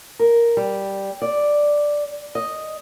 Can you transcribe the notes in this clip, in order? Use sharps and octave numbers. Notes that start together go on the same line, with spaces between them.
A#4
G3
D5
D#5